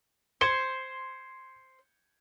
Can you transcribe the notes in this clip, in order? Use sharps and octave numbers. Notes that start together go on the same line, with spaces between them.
C5 G#6 C#7 G7